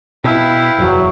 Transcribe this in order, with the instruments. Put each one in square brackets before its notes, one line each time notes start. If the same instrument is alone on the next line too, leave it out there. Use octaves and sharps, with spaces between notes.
[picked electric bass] B2 [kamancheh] E4 [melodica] B4 F5 G5
[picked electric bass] F#1 E2 [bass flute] F#3